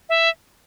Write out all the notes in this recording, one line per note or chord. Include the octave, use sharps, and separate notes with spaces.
E5